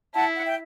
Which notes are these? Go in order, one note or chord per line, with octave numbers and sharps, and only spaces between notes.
E4 F#5 A5
F#5
E5 G5